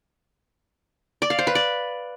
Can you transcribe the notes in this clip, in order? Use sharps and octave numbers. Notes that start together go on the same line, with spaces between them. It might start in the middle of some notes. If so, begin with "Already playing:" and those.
D5
F5
C5
B4
D5